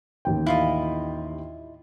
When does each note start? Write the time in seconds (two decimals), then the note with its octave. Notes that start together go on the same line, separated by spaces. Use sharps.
0.25 A1 D#2 G5
0.46 E4 F4 D#5